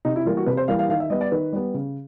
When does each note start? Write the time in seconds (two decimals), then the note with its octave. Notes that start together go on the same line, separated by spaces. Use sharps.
0.05 C3 D#4
0.16 E4
0.25 E3 G3 A#3 F4
0.37 F#4
0.46 C3 B4
0.57 C5
0.68 E3 G3 A#3 F5
0.79 F5
0.89 D#3 F5
1.00 E5
1.10 G3 B3 D#5
1.21 D5
1.31 D#3 B4
1.53 G3 B3
1.74 C#3